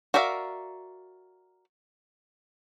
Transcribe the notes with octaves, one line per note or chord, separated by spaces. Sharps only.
F#4 A#4 D5 E5 F5